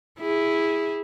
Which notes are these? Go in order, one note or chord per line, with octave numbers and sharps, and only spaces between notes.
E4 G#4